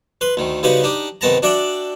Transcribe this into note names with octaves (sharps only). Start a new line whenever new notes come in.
B4 C6
D2 D#3
C#3 G3 B3 D#4 F#4 C5
D4 D#4 G4
C2 D#3 B3 A5 A#5
D4 F#4 D5 E5 G5